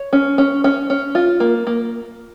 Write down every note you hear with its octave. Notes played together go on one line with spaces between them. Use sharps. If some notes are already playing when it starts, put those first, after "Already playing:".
Already playing: C#5
C#4
C#4
C#4
C#4
F4
A#3
A#3